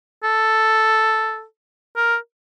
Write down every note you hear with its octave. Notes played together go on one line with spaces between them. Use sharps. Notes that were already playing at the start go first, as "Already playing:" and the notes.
A4
A#4